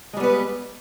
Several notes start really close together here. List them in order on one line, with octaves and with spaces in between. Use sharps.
G#3 G3 B3 B4